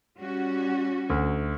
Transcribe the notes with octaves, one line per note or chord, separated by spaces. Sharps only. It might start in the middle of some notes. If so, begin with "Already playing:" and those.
G3 C#4 F#4
D2